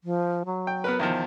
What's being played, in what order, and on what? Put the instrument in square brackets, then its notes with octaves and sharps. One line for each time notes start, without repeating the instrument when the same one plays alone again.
[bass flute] F3
F#3
[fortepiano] G5
B3 A#4 B4
E2 D#3 F3